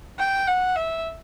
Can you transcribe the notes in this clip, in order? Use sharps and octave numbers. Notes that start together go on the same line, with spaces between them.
G5
F#5
E5